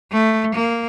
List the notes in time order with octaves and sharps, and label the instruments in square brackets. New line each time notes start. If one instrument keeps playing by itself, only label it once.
[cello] A3
A#3